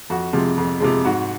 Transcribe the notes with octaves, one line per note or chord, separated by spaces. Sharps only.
F2 F#4
C3 F3 G#3
F2
C3 F3 G#3
G#2 F#4